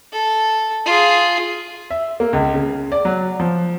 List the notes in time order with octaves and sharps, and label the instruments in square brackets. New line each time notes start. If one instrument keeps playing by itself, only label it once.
[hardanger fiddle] A4
F4 G#4
[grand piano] E5
A#3
C#2
C#3
D5
F#3
F3